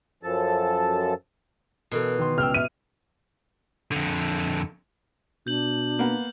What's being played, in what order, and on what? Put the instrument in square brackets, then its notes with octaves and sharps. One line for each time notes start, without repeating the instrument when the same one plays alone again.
[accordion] F#2 F3 A4 A5
[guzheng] B2 E3 [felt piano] A4 A#4
[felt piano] D#3 C6
[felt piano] C#2 G5 E6 [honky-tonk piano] F6
[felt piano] E5 [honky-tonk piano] D#7
[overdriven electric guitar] F2 D3
[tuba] B2 [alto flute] D4 [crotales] G6 F#7
[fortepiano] A#3 B3